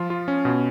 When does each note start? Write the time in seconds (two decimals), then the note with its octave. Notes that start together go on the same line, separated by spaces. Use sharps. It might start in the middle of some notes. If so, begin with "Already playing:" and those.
Already playing: F3 F4
0.10 F4
0.28 C#4
0.45 B2